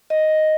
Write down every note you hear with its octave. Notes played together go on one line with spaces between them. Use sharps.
D#5